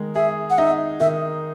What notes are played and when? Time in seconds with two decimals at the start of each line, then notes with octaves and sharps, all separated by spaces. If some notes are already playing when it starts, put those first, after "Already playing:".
Already playing: D#3 G#3
0.16 G#4 E5
0.50 F#5
0.58 D#4 E5
1.00 D#3 E5